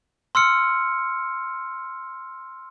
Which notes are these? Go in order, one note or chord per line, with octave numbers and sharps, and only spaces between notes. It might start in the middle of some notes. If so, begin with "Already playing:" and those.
C6 E6 F6 C#7